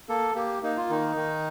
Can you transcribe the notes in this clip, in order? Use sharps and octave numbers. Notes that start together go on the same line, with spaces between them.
A#3 A4
A#3 G4
A#3 D#4
F4
D#3 D#4
D#3